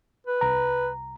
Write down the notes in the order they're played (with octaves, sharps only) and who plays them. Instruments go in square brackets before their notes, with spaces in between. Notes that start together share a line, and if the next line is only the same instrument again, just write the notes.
[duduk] B4
[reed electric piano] C2 A#5